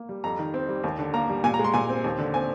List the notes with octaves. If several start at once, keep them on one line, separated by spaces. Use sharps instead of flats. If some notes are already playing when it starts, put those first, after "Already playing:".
Already playing: A#3
G3
F2 A#5
D#3
C4
G3
D#2
D3
A#3 A#5
G3
A#2 G#5
A#5
G#3
C6
A#2 G#5
C4
D#2
D3
C4 G#5